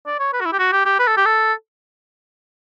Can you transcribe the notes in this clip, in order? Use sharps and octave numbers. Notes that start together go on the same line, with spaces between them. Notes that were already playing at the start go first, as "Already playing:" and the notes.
D5
C#5
B4
F#4
E4
G4
F#4
G4
G4
B4
A4
G4
A4